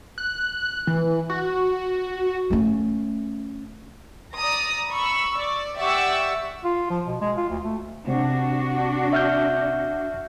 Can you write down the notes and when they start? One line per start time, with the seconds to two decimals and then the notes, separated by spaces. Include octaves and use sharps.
0.18 F#6
0.87 E3
1.30 F#4
2.50 A3 C#4
4.38 D5 A#5 D#6
4.93 B5 C#6 E6
5.40 D5
5.78 G4 D5 E5 F#5 C#6 E6
6.64 F4
6.90 F3
7.06 B2
7.21 G#3
7.37 F4
7.50 D2
7.63 A3
8.07 C3 D4 F#4
9.13 E5 F6 G6